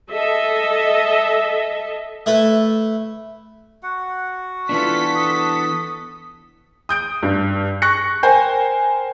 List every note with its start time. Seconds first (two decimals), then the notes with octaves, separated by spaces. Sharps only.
0.11 A4 D#5 E5
2.26 A3 E4 B4
3.83 F#4 F#5
4.69 E3 B3 D4 F4 A4 B6
5.15 D#6
6.89 D#6 G6 D7
7.23 G2
7.82 C#6 F#6 A#6 C#7
8.23 A#4 C5 G5 G#5